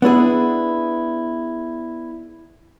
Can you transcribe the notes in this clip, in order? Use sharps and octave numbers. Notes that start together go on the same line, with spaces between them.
B3 D4 E4 G#4